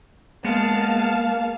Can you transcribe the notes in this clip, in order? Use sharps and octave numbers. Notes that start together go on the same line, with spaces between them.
G#3 A#3 B3 F5 A5 F6